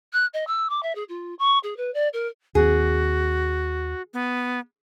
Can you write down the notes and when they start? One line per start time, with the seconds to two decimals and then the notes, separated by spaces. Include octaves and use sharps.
0.13 F#6
0.33 D#5
0.47 E6
0.69 D6
0.82 E5
0.95 G#4
1.09 F4
1.39 C#6
1.63 G#4
1.77 B4
1.94 D5
2.13 A#4
2.55 D#2 C4 F#4 G#4
4.14 B3